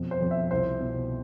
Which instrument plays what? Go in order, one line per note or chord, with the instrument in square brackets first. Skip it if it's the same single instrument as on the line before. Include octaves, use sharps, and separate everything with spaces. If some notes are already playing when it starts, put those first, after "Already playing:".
Already playing: [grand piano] F2 B2
C5
F2
E5
C2 C5
B2